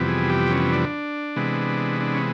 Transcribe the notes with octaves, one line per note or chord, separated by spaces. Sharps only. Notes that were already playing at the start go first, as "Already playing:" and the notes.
Already playing: F2 C3 E3 G3 B3
G#4
G4
C#4
D4
C3 E3 G#3 B3
D4
C#4